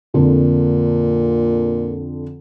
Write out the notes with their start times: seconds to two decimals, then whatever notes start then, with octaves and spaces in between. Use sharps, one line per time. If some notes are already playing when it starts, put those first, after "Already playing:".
0.14 F2 A#2 D3